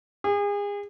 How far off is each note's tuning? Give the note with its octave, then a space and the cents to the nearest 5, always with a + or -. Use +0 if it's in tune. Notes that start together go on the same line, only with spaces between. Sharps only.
G#4 -35